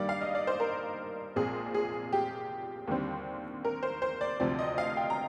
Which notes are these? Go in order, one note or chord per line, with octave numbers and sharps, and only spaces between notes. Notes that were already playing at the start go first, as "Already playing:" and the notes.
Already playing: G2 D#3 G3 A#3 D5
F5
D#5
D5
C5
A#4
A#1 A#2 G#3 C4 G#4
G#4
G4
D#2 D3 G3 C4
A#4
C5
C5
D5
D2 C3 F3 C4 D5
D#5
F5
G5
A#5